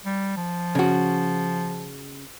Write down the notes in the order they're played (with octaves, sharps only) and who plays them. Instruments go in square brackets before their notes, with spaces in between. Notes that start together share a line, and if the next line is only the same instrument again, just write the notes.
[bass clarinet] G3
F3
[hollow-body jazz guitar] C#3 F#4